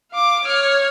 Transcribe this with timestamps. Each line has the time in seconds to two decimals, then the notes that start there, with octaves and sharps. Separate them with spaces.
0.11 F5 D6
0.44 C#5 F6